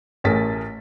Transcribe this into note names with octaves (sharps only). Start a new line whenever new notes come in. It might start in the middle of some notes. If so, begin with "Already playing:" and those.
A1 A3 G#4 A#4 A6 B6